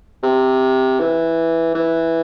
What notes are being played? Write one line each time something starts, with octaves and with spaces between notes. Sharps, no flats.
C3
E3
E3